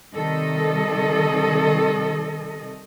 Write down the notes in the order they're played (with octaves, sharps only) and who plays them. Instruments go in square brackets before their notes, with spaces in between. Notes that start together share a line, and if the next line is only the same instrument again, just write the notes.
[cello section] C3 D#3 G3 A4 D#5